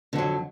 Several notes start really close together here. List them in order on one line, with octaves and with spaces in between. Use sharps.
D3 F2 F#3